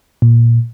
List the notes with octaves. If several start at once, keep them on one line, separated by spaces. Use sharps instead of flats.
A#2